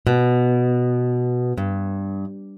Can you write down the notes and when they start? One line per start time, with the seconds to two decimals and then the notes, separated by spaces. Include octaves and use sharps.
0.07 B2
1.57 G2